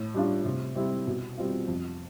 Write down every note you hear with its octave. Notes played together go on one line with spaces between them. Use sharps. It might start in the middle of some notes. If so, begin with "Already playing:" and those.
Already playing: A2
G3 D4 F4
C3
G3 C4 E4
B2
G3 C4 F4
F2